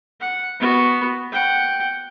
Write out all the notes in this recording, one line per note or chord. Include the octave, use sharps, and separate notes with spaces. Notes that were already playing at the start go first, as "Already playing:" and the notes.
F#5
B3 F#4
F#5 G5